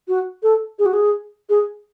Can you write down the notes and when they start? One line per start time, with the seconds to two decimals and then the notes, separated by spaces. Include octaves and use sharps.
0.08 F#4
0.43 A4
0.79 G#4
0.86 F#4
0.93 G#4
1.49 G#4